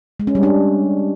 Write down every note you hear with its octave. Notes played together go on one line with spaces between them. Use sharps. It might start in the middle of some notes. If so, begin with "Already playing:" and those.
G#3
C#4
G3
D4